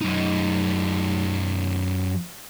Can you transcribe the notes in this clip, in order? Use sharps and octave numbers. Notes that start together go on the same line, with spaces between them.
F#2 D#4